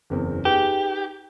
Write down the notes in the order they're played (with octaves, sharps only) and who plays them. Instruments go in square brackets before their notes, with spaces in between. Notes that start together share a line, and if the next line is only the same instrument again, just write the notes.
[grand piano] F#1 E2 C4
[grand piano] D#4 G#4 B4 [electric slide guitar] G4